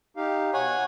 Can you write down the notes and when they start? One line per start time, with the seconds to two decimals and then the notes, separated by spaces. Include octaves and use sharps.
0.17 D#4 G4 F5
0.54 B2 C#5 F#5 G#5